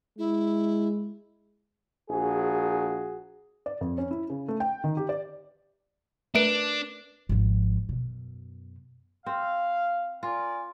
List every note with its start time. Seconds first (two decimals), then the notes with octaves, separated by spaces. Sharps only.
0.18 G#3 E4
2.10 A#1 F#4 G#4
3.66 D5
3.81 F2
3.98 C#4
4.11 E4
4.30 C#3
4.48 A3
4.60 G5
4.84 D#3
4.97 G4
5.09 D5
6.35 A3 D4 A#4 B4 D7
7.29 G#1 F3
7.89 F#2 B2
9.26 C4 F5
10.23 F4 A#4 D5 G#5